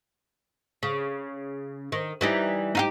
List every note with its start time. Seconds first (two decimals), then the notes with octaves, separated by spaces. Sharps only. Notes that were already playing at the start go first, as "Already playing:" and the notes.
0.83 C#3
1.92 D#3
2.21 E3 G3 D#4
2.75 D#4 F4 G4